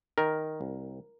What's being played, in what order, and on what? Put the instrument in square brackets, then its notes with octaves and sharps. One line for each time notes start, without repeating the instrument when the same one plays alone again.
[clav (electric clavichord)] D#3 A#4
C2